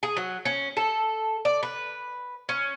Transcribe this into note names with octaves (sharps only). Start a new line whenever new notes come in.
G#4
F#3
C#4
A4
D5
B4
C#4